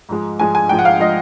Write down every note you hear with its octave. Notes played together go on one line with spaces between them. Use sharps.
G#2 F3 G#3
G#2 F3 G#3 G#5
G#5
G#2 F3 G#3 G5
F#5
F5
F3 G#3 D#5